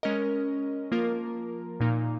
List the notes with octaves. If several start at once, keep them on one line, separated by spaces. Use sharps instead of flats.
G#3 C#4 A#4 D#5
F3 A#3 F4 A#4
A#2 A#3 D#4